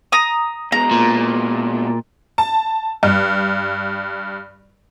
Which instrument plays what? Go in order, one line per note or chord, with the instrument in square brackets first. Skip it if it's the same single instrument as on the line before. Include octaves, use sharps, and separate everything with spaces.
[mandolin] A#5 D#6
[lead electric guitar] B2 G#3 [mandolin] A#5
[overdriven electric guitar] A#2
[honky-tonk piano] A5
G2